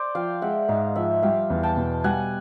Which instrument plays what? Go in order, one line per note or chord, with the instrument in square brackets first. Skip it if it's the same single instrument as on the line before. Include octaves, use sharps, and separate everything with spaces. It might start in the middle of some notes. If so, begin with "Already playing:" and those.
Already playing: [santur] C5 D5
[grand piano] F3 [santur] F5 G5
[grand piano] G#3 [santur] E5 F#5
[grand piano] G#2 [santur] D#5 F5
[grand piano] F3 [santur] E5 F#5
[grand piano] G3 [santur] F5 G5
[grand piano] E2
[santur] G5 A5
[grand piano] B2
[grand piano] G3 [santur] F#5 G#5